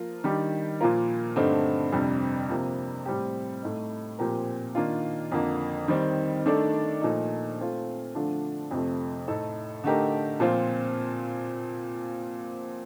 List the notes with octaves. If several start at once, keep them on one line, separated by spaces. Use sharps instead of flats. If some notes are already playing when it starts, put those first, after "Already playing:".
Already playing: F3 A#3 F4 A#4
D#3 G3 D4 G4
A#2 F3 A#3 F4 A#4
G2 D3 A3 C4 D#4
F2 C3 G3 D4 G4
C3 F3 A#3
A2 G3 C4 G4
A2 A3 D#4
A#2 F3 C4 G4 A#4
D#3 A#3 D4 F4
F2 D3 F3 A#3
D#3 G3 C4
D#3 A3 D4 A4 D5
A#2 F3 A3 D#4
A3 C4 F4
D3 F3 A3 D4 F4
F2 C3 F3 A3
A2 A3 D#4 A4
D3 A3 D#4 G4 A#4
A#2 F3 C4 F4